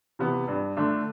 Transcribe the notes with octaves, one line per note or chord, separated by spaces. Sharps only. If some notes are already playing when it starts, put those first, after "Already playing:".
C3 E3 B3
G2
D3 A3 D4